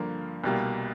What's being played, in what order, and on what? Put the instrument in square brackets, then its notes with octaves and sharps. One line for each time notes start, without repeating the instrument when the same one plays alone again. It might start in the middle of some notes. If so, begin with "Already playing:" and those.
Already playing: [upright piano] G2 D3 F3 A#3
C2 B2 G3 A#3